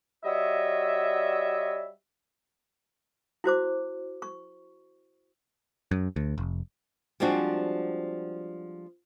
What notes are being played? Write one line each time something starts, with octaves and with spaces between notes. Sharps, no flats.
G3 F#4 C#5 D#5 E5
E4 F#4 C5 D6
C#6
F#2
D2
F1
F3 G3 G#3 C4 D4 F#4